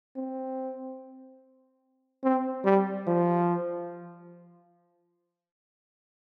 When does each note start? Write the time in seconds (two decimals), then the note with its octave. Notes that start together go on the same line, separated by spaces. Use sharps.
0.16 C4
2.24 C4
2.65 G3
3.07 F3